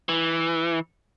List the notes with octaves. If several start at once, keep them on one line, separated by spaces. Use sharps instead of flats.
E3